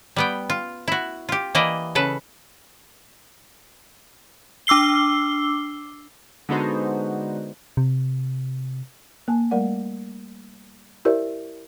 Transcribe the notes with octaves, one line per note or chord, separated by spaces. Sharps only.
G3 B3 G5
F4
E4 F#4
F4 G4
E3 A#3 E4 D5 D#5
C#3 A4 B4
D4 D6 E6 C7 G7
D3 G#3 B3 D#4 F#4 C5
C3
A#3 G#5 A5
G3 A3 A#4 D5 F#5
E4 G4 A#4 C5 D5 E5